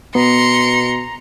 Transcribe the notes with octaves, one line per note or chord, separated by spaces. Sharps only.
B2 B3 A#5 C6 C#7